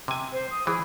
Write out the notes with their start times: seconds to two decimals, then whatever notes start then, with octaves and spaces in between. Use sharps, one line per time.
0.08 C3 G#5
0.32 C5
0.51 D#6
0.67 E3 G#4